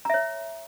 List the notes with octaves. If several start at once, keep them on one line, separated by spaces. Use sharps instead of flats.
C#5 E5 A#5